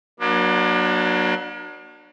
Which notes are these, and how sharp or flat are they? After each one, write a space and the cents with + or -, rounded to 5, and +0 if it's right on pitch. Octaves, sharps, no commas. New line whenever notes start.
F#3 +0 A#3 +45 D4 +30